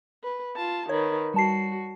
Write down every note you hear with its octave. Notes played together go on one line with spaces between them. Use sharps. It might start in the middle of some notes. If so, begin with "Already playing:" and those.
B4
F4 A5
D#3 B4 C#5
G3 F#4 A5 C7